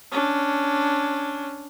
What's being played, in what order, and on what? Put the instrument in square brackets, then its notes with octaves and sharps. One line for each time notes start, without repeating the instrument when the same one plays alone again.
[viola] C#4 D4